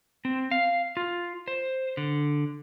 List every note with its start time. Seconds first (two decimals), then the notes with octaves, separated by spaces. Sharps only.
0.25 C4
0.51 F5
0.97 F4
1.48 C5
1.97 D3